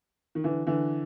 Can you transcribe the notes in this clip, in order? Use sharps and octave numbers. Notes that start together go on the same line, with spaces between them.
D#3
D3 E3
D3 E3